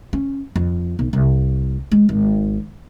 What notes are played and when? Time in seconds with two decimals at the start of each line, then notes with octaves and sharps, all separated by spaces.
0.13 C#4
0.56 F2
0.99 B1
1.13 C2
1.92 G#3
2.09 G#1